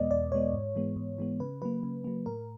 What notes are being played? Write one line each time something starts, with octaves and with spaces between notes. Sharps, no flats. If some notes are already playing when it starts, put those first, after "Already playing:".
Already playing: E2 B2 G#3 B3 D5 D#5
E2 D5
B2 G#3 B3 C#5
G#2
E3 G#3 B3
G#2
E3 G#3 B3
C#3 B4
F#3 A#3 B4
C#3
F#3 A#3
A2 A#4